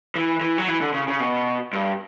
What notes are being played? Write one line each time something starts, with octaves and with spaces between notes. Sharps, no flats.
E3
E3
F#3
E3
D3
C#3
C#3
B2
G2